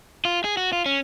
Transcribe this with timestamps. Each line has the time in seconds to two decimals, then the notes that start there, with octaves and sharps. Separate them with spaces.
0.25 F4
0.44 G#4
0.57 F#4
0.73 F4
0.86 C#4